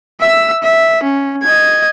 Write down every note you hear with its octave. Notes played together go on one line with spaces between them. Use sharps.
E5 E6
E5
C#4
D#5 G#6